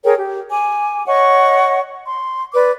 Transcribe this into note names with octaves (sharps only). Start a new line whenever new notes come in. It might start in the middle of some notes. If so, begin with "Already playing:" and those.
G#4 A#4 C#5 G5
G4
G#5 D6
C#5 D#5 F#5 C#6
C6
B4 D5 D6